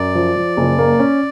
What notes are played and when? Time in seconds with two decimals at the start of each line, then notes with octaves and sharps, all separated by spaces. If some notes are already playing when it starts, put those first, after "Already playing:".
Already playing: F#2 D5
0.15 F3
0.36 F3
0.57 F#1
0.79 A#3
0.99 C#4